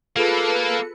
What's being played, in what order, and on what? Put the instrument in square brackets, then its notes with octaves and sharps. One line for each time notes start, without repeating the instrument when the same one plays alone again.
[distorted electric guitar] A#3 [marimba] F4 G#4 [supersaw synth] A4 B4 C#7